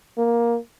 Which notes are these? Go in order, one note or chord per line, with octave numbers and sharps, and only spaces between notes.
A#3